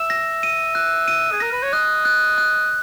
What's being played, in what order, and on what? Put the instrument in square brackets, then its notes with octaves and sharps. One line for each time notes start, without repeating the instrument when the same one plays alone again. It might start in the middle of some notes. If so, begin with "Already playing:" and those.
Already playing: [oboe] E5 [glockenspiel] E7
[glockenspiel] A#6
D#7
F#6
D#7
[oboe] G#4
[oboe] A#4 [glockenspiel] A#6
[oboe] B4
C#5
[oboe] D#5 [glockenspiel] F#6
[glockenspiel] F#6
F#6